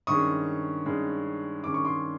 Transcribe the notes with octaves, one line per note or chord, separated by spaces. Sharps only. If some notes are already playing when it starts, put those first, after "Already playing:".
G2 D#3 G#3 C#4 C#6 D#6
G2 D#3 G#3 C#4
G2 D#3 G#3 C#4 D6
C#6
C6 D6